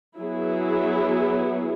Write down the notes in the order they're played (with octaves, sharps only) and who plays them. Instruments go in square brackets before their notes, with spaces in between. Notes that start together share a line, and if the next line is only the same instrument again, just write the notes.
[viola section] F#3 B3 E4 G#4